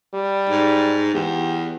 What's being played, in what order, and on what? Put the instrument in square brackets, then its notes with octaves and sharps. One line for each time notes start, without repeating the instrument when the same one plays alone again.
[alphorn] G3
[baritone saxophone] G#2
[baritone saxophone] E2 [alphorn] G4